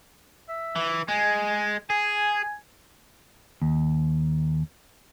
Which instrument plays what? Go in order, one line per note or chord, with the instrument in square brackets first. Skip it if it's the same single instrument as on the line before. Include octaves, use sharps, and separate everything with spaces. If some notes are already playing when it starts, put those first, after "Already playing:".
[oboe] E5
[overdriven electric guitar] E3
[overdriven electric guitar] G#3 [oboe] G#5
[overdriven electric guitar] G#4 [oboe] G#5
[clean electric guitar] D#2